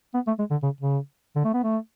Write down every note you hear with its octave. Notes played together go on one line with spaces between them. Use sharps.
B3
A3
G#3
D3
C#3
C#3
D3
A3
B3
A3